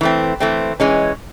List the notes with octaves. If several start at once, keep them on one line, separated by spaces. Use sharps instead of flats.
E3 A3 C4
E3 A3 C4
E3 G#3 C#4